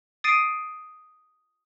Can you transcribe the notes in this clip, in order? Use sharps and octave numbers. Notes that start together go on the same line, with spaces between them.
D#6 A6 C7 D7 D#7